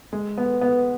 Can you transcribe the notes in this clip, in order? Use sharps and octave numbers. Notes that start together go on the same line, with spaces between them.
G#3
B3
B3